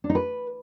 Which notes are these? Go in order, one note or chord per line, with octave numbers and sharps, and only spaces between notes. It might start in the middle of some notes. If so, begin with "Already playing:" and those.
D4
D#4
B4